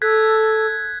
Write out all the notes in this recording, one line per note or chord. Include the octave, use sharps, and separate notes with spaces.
A4 F#6 G#6 B6